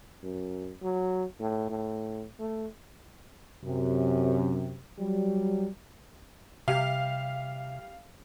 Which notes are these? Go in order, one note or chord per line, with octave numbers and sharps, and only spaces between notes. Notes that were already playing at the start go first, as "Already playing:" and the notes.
F#2
F#3
A2
A2
A3
F#2 C3
F#3 G3
C3 G3 G4 E5 F5